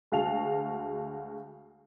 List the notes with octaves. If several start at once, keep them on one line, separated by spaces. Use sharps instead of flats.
D2 G#3 F#4 F5 A5 F7